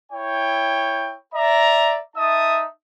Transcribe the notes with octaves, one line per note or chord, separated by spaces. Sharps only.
E4 C#5 G5
D5 E5 A#5
D#4 E5 A5 D#6